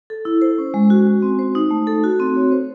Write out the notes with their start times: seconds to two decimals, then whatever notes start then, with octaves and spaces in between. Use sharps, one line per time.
0.10 A4
0.25 E4
0.42 C5
0.58 C#4
0.74 G#3
0.90 F#4
1.07 F#4
1.22 C4
1.39 C5
1.55 D#4
1.71 A3
1.87 A4
2.03 F#4
2.20 C4
2.36 C#5
2.52 C5